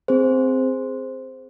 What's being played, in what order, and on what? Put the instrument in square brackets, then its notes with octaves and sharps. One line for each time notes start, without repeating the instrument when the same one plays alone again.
[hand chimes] C4 G#4 C5